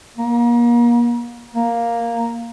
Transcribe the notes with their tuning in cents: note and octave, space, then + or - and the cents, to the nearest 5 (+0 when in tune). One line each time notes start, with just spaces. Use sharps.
A#3 +35
A#3 +0